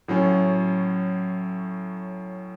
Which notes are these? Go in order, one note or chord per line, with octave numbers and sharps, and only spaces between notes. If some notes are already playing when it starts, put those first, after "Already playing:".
A2 F#3 C#4